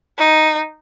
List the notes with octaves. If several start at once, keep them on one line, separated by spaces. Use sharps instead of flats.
D#4